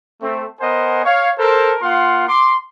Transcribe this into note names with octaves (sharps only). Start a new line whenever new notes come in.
A3 C4
B3 A#4 C5 D#5 F#5 G#5
C#5 F5
A4 A#4 C5
A#3 F4 F5 F#5 C6
C6 D6